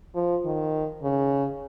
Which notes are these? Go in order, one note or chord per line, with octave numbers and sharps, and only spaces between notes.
F3
D#3
C#3